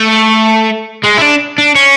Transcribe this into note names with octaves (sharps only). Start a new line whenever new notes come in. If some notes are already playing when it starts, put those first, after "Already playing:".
Already playing: A3
G#3
E4
D4
D4
C#4